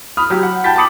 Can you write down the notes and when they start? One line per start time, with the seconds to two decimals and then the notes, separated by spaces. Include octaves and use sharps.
0.17 B5 D#6 F6
0.30 F#3 G4
0.43 F#5
0.64 G5 A5 B5 G6 A6 B6
0.76 A5 B5 D6 D#6 C#7 F#7